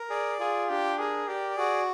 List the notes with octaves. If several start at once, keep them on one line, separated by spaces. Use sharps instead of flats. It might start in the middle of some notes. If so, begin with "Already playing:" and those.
Already playing: A#4
G#4 D5
F4 G#4
D4 G4
G#4 A#4
G4 D5
F#4 G#4